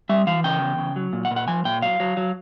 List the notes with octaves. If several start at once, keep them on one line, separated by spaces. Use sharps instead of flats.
G3 E5
E3 F5
C#3 G5
E2
C#3
F#3
A#2
F#5
A#2
F#5
F3 G#5
A#2 G5
F#3 F5
F#3
F#3